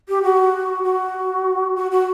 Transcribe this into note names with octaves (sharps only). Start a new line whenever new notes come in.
G4
F#4
F#4
F#4
F#4